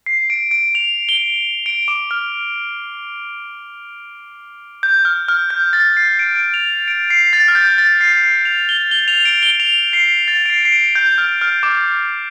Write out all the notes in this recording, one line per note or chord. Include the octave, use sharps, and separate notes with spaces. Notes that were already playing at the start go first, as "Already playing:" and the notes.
C7
D7
D7
F7
G7
D7
D6
F6
G6
F6
F6
G6
A6
C7
D7
D7
F7
D7
C7
A6
F6
G6
A6
C7
C7
F7
G7
G7
F7
D7
G7
F7
C7
A6
D7
C7
C7
D7
G6
F6
F6
D6